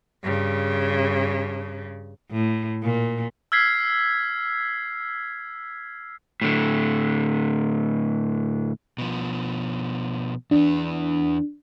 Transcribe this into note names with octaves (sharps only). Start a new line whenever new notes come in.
G2 C#3
A2
A#2
E6 F6 G#6 B6 C7
A2 D3
B2 F3
E2 E3 D4